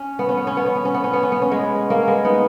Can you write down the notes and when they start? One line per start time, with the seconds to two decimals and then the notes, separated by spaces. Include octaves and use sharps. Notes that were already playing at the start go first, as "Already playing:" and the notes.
Already playing: C#4
0.19 B3
0.29 C#4
0.38 B3
0.47 C#4
0.57 B3
0.66 C#4
0.75 B3
0.85 C#4
0.94 B3
1.04 C#4
1.13 B3
1.23 C#4
1.32 B3
1.42 C#4
1.51 G#3 B3
1.90 A#3 C#4
2.07 G#3 B3
2.25 B3 D#4